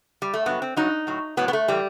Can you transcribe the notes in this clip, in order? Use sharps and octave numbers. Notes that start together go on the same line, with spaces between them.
G3
A3
G2 F#3 B3
C4
G2 F#3 D#4
A2 F#3
A2 F#3 B3
B3
A3
A2 E3 G3